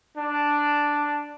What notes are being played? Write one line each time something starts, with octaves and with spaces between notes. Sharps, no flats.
D4